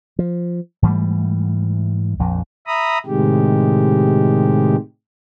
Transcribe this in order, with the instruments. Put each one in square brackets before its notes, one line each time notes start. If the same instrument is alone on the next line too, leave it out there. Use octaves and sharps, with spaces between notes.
[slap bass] F3
G#2 E3 G3 A3
A#1 F2
[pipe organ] E5 A#5 B5 D#6
A2 C3 D#3 G#3 G4